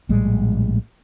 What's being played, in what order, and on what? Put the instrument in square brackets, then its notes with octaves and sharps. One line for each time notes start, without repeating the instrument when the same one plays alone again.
[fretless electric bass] A#1 A2 G3 G#3